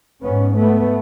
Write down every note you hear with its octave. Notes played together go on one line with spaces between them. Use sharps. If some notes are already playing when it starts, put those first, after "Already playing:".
G#2 B3 C#4
A3 B3